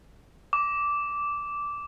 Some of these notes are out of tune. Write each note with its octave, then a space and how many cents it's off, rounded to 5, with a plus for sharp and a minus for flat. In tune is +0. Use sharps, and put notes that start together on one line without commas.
D6 -10